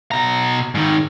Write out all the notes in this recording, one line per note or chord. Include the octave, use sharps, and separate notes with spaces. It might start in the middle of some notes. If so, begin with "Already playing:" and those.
B2 A#5
G#2 D#3